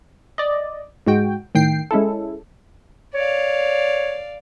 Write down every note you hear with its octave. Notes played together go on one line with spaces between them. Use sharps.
D5 D#5
G#2 G#3 F#4 G5
A2 D#3 G5 C7
G#3 C#4 E4 A4
C#5 D5 F5